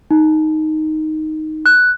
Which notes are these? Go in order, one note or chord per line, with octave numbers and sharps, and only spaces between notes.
D#4
F#6